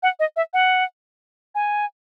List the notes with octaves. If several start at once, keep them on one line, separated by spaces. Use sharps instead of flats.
F#5
D#5
E5
F#5
G#5